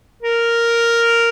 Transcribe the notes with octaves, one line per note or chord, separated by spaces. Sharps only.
A#4